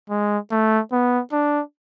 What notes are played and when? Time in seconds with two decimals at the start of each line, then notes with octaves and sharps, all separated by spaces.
0.10 G#3
0.51 A3
0.92 B3
1.32 D4